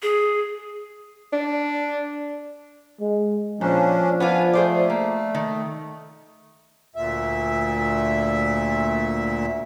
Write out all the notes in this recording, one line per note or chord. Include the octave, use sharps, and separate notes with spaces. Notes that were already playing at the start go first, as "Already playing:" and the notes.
G#4
D4
G#3
A#2 F3 C#4 D4
B3 D4 F4 G#5
A3 G#4 C5 D5
A#3
D#3
D2 A#2 E5